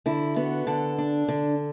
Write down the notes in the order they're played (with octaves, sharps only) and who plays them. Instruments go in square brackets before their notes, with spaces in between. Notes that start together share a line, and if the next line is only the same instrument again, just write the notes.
[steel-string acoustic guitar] D3 E4
B3 F#4
D3 A4
D4
D3